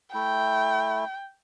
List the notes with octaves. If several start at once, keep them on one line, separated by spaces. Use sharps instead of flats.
A3 E4 G5